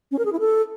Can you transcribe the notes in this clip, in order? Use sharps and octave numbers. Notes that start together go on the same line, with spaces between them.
C#4
A#4
G#4
E4
A4